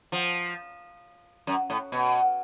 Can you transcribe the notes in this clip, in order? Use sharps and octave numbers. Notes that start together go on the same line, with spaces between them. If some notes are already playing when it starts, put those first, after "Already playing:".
F3
F#2
A2
B2